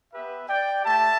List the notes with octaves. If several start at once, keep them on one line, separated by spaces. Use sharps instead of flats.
B3 G4 B4 E5
D5 G5
A3 G4 E5 A5